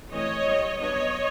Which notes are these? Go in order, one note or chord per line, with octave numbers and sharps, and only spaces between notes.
E3 A3 C4 C#5 D#5
G3 C4
F#3 B3 D4 C#5 D#5